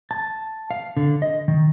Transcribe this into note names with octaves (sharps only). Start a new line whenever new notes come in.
A5
F5
D3
D#5
D#3